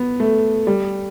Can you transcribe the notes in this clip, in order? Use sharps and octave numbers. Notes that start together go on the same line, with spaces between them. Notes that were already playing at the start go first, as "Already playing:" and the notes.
Already playing: B3
A3
G3